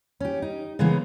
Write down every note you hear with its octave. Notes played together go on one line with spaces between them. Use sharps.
C#4 G4
D#4
C#3 E3 G#3 A#3 B3